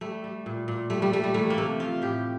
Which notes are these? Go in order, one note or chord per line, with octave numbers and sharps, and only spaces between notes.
G3 A3
G3
A#2
A#2
G3 A3
G3
G3 A3
G3
E3 A3
A#3
C3 A3
F3 F4
A2 G4